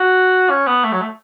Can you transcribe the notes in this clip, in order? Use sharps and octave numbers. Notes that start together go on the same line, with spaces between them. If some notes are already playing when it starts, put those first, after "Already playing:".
Already playing: F#4
C#4
B3
A3
F#3
A3